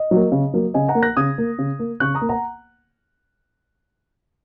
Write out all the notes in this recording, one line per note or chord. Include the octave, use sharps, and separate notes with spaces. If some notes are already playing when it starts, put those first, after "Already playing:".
Already playing: D#5
F#3
A#3
C#3
F#3 A#3
C#3 D#5 G#5
F#5 A#5
A#3
F#6 A#6
C#3 D#6 G#6
A#3
C#3
A#3
C#3 C#6 F#6
A#5 D#6
A#3
F#5 A#5